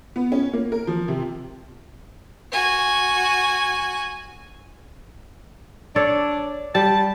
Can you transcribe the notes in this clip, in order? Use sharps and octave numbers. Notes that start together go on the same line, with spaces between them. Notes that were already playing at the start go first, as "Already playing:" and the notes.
B3
C#4
A#3
A#4
F3
C3
F#4 G#5
D4 A4 C#5 D5
G3 A5